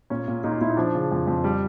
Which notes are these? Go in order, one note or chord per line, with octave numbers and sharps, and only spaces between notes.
A#2 C#4
A#2
A#2 D#4
F4
A#2 E4
D#4
F3 D4
C#3
F2
F2
G3